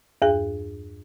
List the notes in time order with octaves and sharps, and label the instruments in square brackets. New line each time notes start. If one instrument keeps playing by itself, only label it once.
[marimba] E2 G2 G#4